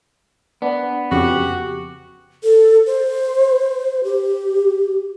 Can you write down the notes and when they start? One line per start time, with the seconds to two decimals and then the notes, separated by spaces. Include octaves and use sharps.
0.62 B3 D4
1.11 F2 C#3 F#4 G4
2.43 A4
2.87 C5
4.04 G4